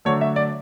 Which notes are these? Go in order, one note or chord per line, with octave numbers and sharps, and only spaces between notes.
D3 F#3 A3 C#5
E5
D5